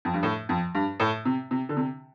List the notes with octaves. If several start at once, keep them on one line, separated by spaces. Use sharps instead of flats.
F2
G2
A2
F2
G2
A2
C3
C3
D3
C3